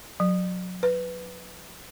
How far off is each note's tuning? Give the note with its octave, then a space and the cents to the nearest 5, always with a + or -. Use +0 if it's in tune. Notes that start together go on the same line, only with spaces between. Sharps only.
F#3 -25
B4 +10